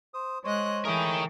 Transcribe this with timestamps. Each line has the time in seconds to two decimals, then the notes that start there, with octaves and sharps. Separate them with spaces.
0.14 C5 D#6
0.44 G#3 C5 C#5 D#5 F#6
0.85 E3 A3 G#4 A#4 C#5 G5